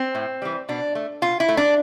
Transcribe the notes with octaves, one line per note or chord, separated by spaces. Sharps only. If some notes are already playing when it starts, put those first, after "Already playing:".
Already playing: C4
A2
E3 G3
B2 D4
A3
B2 F4
E4
A3
D4